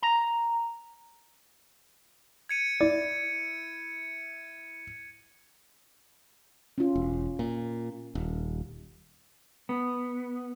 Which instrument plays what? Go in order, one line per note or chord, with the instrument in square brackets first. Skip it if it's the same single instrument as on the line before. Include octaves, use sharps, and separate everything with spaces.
[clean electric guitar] A#5
[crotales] G#6 C#7 D#7
[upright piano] E4 [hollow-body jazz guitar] D5
[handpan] C#4 F4
[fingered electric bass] E1
A#2
D#1
[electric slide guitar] B3